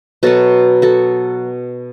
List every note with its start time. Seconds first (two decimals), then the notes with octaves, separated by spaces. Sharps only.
0.23 B2 F#3 B3 F#4 A4
0.82 F#4 A4